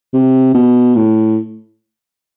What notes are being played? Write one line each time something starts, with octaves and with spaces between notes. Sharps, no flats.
C3
B2
A2